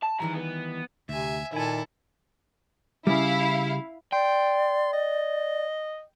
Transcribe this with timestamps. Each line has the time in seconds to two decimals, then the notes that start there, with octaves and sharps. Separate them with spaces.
0.03 A5
0.20 D#3 E3 G3 G#4 A#5
0.34 B3
1.09 D2 C3 E5 G#5
1.53 A#2 D#3 E4 A4 E5 G#5
3.07 C#3 G3 E4 F5
4.12 D5 G5 C6
4.93 D#5